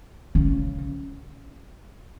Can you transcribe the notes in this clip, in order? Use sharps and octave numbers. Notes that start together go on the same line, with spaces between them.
C#3